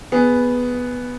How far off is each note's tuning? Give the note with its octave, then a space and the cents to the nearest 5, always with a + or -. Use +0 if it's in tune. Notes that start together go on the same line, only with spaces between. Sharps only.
B3 +0 G#4 +0